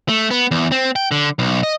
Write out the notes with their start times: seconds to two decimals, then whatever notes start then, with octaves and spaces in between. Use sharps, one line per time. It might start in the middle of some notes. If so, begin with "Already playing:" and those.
0.09 A3
0.31 B3
0.51 E2
0.72 C4
0.96 G5
1.11 D3
1.39 B1
1.63 D#5